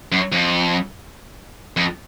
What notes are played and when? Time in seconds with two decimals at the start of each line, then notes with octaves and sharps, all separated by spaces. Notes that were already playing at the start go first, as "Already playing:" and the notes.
0.12 F#2
0.32 F2
1.77 F2